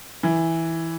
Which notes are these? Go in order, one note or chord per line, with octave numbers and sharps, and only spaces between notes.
E3